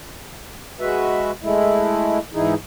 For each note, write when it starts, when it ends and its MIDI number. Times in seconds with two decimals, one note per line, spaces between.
0.80 1.31 56
0.80 1.31 66
0.80 1.31 71
0.80 1.31 76
1.43 2.18 56
1.43 2.18 57
1.43 2.18 64
2.34 2.54 44
2.34 2.54 52
2.34 2.54 63
2.34 2.54 64
2.34 2.54 68